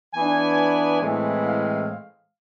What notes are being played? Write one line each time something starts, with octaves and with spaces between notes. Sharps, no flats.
E3 B3 D4 G#5
A2 E3 G#3 C4 G#5
F5